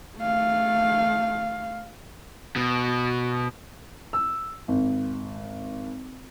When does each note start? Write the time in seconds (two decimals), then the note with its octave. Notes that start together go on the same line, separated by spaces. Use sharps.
0.18 A3 F5
2.56 B2
4.13 E6
4.68 G#1